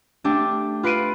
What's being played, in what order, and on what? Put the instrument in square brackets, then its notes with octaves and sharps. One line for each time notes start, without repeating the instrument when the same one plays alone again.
[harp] A3 D4 G4
F4 B4 C7 D7 D#7